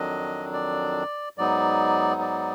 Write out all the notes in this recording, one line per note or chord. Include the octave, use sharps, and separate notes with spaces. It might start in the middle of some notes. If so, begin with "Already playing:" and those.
Already playing: F2 D#3 F#3 D4 D#5
D5
G#2 F#3 B3 D#4 D5
D5